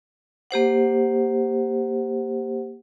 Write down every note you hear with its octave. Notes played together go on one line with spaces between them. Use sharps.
A#3 G4 C5 F#5